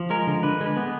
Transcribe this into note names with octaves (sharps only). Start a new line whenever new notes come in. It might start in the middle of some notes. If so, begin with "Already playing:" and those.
Already playing: F3
G#3 A#4
D3
D3 B4
G#3
B4
B3